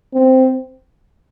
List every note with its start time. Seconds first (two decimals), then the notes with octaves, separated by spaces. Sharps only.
0.14 C4